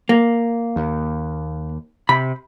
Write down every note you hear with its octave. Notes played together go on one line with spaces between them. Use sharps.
A#3
D#2
C3 B5